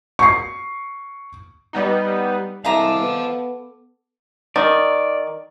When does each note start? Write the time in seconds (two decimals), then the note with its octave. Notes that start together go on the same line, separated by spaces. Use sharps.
0.19 C#6 C7
1.73 G3 B3 D#4
2.65 C2 G#3 A4 E5 F5 A5 A#5 D6
3.00 B3
4.56 D#3 D5